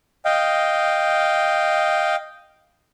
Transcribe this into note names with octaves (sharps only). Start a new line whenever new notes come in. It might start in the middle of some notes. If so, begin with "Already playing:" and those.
D#5 F5 G5